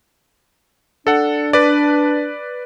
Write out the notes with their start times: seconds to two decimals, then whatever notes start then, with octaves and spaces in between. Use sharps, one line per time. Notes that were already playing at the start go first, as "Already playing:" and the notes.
1.07 D4 A4 F#5
1.53 B4 D5